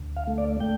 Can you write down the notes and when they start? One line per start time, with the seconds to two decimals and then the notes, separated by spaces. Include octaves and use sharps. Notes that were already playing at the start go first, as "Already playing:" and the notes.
Already playing: D2
0.16 F5
0.27 A3
0.38 D5
0.60 A3 G5